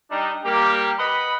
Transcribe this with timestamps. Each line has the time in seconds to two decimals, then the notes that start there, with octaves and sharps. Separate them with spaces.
0.11 G3 D4 D#4
0.45 G3 A#3 G4
0.99 B4 D#5 F#5 B5